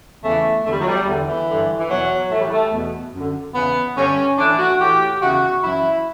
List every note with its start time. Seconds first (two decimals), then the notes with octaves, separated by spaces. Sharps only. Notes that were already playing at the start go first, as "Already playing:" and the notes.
0.23 E2 C#3 E3 A3
0.64 E2 D3 A3
0.73 G3
0.81 F#3
0.89 G3
1.06 E2 D3
1.27 E3
1.49 G2 D3
1.78 E3
1.90 E2 B2 F#3
2.31 A2 E3 A3
2.40 G3
2.51 A3
2.72 E2 B2
3.13 F#2
3.19 D3
3.55 E2 C#3 E3 B3
3.97 G2 D3 C#4
4.38 A2 E3 D4
4.59 F#4
4.80 A2 E3 G4
5.22 E2 C#3 E3 F#4
5.63 F#2 E3 E4